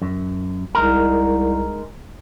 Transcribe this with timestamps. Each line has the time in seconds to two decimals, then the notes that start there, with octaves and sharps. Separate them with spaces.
0.02 F#2
0.75 C2 G#3 D#4 A#4